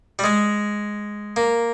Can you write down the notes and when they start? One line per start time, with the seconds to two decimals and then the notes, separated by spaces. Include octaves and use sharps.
0.19 G3
0.24 G#3
1.36 A#3